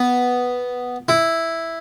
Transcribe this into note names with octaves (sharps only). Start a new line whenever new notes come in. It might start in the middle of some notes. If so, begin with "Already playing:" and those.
Already playing: B3
E4